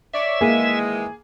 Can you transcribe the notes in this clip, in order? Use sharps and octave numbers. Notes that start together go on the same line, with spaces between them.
C#5 D5 E5
D#3 E3 G#3 A#3 G#4